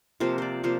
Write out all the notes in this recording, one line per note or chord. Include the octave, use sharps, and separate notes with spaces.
C3 F3 A#3 C5
C5 D5
C3 F3 A#3 C5